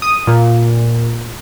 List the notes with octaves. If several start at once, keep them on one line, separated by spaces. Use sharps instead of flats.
D#6
A#2